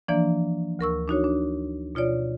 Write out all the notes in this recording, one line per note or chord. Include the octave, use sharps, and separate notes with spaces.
E3 F3 A#3 D4 D5
D2 A#4 C#6 E6
D4 D#4 F#4 C#5
D4
B2 F4 C#5 D5